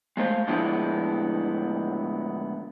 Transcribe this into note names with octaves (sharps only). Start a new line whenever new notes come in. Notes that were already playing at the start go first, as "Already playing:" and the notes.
G#3 A3 C5 F5
A2 D3 F3 G#3 B3 E4